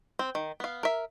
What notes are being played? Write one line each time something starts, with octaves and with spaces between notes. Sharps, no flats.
C4
D#3
B3 F5
A#4 E5